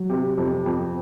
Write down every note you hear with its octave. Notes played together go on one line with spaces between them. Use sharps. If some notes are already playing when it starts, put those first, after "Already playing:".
Already playing: F#3
C3
F2
F2